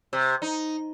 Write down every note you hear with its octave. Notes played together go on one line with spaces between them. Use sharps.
C3
D#4